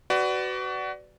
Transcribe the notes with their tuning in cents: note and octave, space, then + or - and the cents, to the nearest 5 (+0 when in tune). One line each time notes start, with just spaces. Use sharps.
F#4 +25 B4 +20 D5 +0